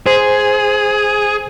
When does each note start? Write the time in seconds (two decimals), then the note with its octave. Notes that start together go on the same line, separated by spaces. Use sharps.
0.06 G#4 C5